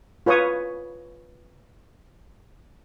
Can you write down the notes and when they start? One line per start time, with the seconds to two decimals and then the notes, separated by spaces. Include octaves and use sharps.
0.26 F4 B4 C#5 C#6 D#6